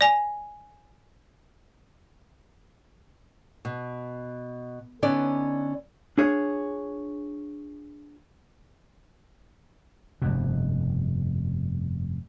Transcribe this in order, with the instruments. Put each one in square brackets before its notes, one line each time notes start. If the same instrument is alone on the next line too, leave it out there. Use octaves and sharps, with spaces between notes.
[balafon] D5 G#5
[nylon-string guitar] B2
D3 B3 C#4 D#4 D5
[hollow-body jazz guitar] D4 F4 G#4 C#5
[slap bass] F1 G2 B2